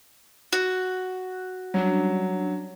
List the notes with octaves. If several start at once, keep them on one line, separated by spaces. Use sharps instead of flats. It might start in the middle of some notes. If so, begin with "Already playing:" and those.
F#4
F#3 G3 C#4 D4